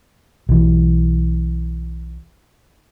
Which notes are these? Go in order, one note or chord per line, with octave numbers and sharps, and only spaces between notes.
B1 E3